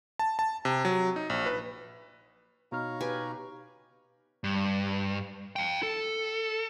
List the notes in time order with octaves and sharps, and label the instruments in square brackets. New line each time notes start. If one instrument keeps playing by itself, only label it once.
[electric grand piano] A5
A5
C3
F#3
D#4
A#1
B4
[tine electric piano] B2 D#4 F6 [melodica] C#5 F5 A#5
[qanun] G4 B4 G#5
[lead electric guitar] G2
F5 G5
A4